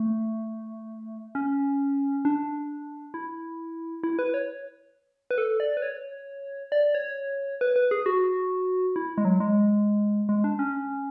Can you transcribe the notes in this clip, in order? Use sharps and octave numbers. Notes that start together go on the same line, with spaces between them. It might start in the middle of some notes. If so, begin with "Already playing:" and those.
Already playing: A3
C#4
D4
E4
E4
B4
C#5
B4
A4
D5
B4
C#5
D5
C#5
B4
B4
G#4
F#4
E4
G#3
F#3
G#3
G#3
D4
C#4